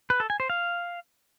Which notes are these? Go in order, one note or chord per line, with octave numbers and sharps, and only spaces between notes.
B4
A4
G#5
C5
F5